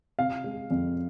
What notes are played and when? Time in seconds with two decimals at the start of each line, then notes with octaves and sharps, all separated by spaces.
0.19 C3 F5
0.44 G#3
0.71 F2